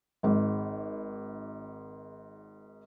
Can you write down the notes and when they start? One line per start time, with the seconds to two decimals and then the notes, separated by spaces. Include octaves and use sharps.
0.23 G#1 G#2